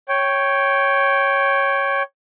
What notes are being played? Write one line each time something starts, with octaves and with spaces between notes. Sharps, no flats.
C#5 G5